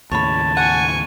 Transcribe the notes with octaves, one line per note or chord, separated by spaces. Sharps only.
D#2 A2 C#3 C#5 A5 B5
F#5 G#5 C#6